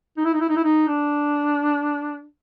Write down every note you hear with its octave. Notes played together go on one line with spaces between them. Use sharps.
D#4
E4
D#4
E4
D#4
E4
D#4
D4